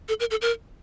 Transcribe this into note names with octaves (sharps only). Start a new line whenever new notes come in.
A4
A#4
A4
A#4